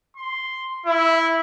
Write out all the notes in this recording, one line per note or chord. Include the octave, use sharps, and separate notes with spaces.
C6
E4